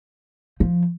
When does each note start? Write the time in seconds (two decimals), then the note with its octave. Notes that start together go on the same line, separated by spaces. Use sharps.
0.60 F3